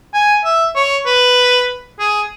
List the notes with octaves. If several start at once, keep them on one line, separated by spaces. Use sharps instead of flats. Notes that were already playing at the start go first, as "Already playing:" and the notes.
G#5
E5
C#5
B4
G#4